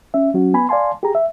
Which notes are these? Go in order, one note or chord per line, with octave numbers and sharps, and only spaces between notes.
C#4 E5
F#3 C#4 F#4
B3 G#5 B5
D5 F5 G#5 A5 C6
G4 G#4 A#5
E5